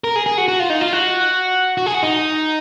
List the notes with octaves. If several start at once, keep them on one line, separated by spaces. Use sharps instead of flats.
A#4
G#4
G#4
F#4
F#4
F4
D#4
F4
F#4
F#4
G#4
F#4
D#4